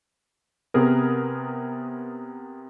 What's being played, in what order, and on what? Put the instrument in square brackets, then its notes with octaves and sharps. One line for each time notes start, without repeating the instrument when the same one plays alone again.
[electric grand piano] C3 B3 G#4 A#4